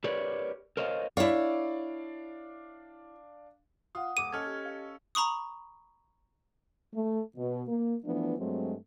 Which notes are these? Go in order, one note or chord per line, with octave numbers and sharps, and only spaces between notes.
G4 A#4 B4 C#5 D5
A#4 C5 C#5 D#5 F5
D4 E4 C#5 D5 F5
F4 F#5 D#6
D#1 D6 D#7
C#4 A4 D#5 F6 G#6
G4 D#5
F5
A#5 B5 C#6 D#6
A3
B2
A#3
E3 F3 A3 B3 D4
G2 F#3 G#3 A3 C4